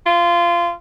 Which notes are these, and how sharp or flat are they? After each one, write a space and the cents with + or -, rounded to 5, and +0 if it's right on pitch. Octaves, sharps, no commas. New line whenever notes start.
F4 -20